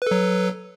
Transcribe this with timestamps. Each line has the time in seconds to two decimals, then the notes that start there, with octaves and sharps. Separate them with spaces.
0.02 B4
0.07 A4
0.11 F#3